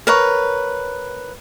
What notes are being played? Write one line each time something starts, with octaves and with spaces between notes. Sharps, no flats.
A#4 B4 C#5